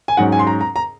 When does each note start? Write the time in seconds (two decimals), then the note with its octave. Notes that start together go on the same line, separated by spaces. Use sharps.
0.08 G#5
0.17 G#2 F#3 C#4 F#5
0.32 G#5
0.39 C6
0.47 A#5
0.61 A#5
0.76 A#5